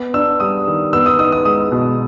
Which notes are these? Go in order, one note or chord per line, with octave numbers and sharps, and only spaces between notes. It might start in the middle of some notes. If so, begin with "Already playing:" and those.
Already playing: B3
D4 E6
G3 D#6
D#3
B3 E6
D#6
D#4 D#6
D#6
G#3 D#6
B2